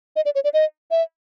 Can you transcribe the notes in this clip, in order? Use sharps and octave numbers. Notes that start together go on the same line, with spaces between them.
D#5
D5
C#5
D5
D#5
E5